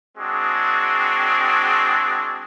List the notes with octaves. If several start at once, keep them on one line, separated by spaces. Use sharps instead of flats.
G#3 C4 D4 F#4 G#4